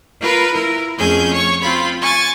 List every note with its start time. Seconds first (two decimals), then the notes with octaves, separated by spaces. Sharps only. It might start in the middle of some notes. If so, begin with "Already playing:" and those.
0.21 F4 A#4 B4 B5
0.52 E4 A#4
0.97 F2 A3 C#4 G#4 G#5 G6
1.32 C#5 C#6
1.63 C4 F4 B5
2.01 G#5 C#6 A6